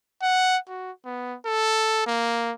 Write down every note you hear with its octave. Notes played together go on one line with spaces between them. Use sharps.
F#5
F#4
B3
A4
A#3